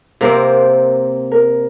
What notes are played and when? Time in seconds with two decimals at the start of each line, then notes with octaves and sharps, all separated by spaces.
0.21 C3 A#3 C4 A#4 C5
1.31 A#4